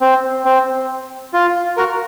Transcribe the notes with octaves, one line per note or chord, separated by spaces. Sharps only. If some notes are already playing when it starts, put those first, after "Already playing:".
C4
C4
F4
F#4 A#4